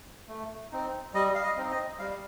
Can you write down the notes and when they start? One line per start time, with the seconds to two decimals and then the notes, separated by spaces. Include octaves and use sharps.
0.28 A3
0.72 C4 D#4
1.14 G3 D#5
1.35 F5
1.43 D#5
1.57 C4 D#4
1.71 D#5
1.99 G3 F5